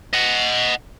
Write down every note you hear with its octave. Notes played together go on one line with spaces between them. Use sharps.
D#5 F#5